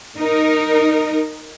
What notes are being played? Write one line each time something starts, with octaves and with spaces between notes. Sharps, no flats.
D#4 A#4